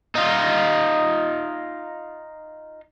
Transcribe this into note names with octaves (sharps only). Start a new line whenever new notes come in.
D#4 F4